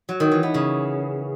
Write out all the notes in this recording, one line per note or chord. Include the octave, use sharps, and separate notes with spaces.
F#3
D#3
E3
B3
C#3